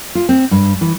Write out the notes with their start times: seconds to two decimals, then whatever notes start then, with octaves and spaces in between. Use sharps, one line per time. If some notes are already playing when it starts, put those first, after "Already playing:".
0.15 F4
0.29 C4
0.51 G2
0.81 E3